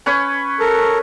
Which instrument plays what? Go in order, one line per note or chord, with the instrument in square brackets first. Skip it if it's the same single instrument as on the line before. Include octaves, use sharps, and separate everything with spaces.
[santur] C#4 B4 C#5
[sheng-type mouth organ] A4 A#4